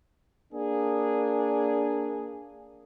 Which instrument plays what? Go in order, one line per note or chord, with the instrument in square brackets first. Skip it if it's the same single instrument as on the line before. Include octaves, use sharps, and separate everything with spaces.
[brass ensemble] A#3 D4 G#4